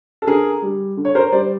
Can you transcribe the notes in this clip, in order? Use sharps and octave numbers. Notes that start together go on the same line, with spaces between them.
A4
D3 G#4 A#4
G3
D3
C#5
A#4 C5
G3 C5 D5